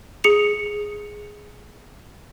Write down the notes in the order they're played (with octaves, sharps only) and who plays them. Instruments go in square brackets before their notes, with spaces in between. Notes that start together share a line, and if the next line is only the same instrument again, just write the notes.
[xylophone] G#4 C#7 F7